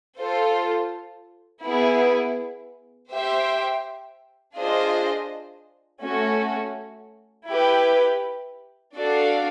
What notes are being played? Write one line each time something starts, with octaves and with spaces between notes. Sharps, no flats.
F4 A4 C5
B3 E4 G#4
G4 C5 E5 G5
D4 F4 G#4 C5 D#5
A3 C#4 F#4
E4 G4 B4
D4 F#4 A4 D5 F5